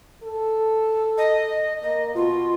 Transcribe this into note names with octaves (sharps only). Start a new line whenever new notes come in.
A4
D#5
A#3 D#5
B2 F4